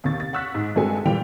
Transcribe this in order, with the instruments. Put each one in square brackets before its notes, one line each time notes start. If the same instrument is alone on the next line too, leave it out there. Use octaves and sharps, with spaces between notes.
[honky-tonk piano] D#2 C3 C#6 A6
A6
F#5 C#6 E6 F#6 B6
G#2
G2 G#3 C4 F#4 A4 G#5
A#2 E3 G3 G5 F7